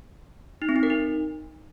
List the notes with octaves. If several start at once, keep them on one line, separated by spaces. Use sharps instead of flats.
D#4
C4
D#4
A#4
D#4